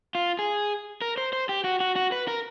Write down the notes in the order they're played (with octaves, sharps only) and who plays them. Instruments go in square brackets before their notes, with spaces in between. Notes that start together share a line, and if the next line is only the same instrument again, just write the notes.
[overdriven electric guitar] F4
G#4
A#4
C5
C5
G4
F#4
F#4
F#4
B4
A#4